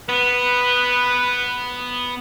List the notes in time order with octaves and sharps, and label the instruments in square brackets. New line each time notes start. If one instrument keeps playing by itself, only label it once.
[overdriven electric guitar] B3 [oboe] B4